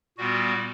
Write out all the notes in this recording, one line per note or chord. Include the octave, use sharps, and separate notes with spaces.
A#2 G3 B3 F#4